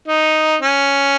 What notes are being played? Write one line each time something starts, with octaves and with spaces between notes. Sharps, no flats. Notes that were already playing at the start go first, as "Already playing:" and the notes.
D#4
C#4